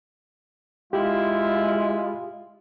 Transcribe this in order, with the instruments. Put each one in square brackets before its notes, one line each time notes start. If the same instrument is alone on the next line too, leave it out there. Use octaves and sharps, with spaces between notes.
[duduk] G#3 [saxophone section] E4 [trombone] F4 [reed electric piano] G4